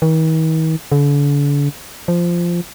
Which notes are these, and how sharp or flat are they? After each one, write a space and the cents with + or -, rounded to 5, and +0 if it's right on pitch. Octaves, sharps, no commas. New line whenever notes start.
D#3 +45
D3 -40
F3 -10